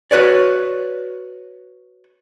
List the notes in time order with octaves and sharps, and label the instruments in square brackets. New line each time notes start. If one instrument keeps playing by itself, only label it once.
[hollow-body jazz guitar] F#4 B4 C#5 D5